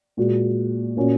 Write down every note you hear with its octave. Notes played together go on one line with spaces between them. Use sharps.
A#2 G#3 F#4
A#2 A#3 C#4 F#4